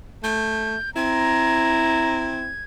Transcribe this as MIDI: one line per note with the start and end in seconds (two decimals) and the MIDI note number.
0.24 0.76 57
0.24 0.90 91
0.96 2.51 60
0.96 2.49 64
0.96 2.42 82
0.96 2.64 92